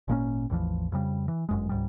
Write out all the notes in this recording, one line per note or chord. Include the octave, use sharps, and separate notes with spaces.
G#1 A#2 A#3 C#4
A1 E2 E3 F3
F2 C#3 G3
E3
G1 F#2 G#3
C#2 G#2 G3